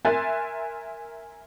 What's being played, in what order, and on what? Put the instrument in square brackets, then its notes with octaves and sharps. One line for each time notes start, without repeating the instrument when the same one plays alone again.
[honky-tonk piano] A#4 E5 G#5 C6 F#6 A6